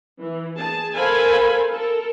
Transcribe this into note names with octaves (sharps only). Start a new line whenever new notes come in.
E3
G#4 A5
A4 A#4 C5 F5 G#5 B5
A4 A#4